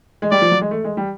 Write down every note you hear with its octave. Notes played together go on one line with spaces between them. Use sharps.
G#3
G3 D5
F3
F#3
G#3
A3
G#3
G3